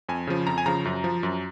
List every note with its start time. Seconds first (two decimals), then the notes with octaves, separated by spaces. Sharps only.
0.09 F2 G#5
0.27 C#3 F3
0.47 F2 A#5
0.58 G#5
0.66 C#3 F3 A#5
0.85 F#2
1.04 F3
1.23 F#2